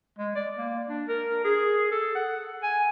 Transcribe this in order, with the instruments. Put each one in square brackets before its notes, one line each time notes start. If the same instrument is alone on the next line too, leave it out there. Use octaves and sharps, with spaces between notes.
[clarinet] G#3
D5
A#3
D4
A#4
G#4
A4
F#5
G#5